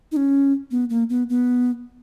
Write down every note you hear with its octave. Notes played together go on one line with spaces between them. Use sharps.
D#4
C#4
B3
A#3
B3
B3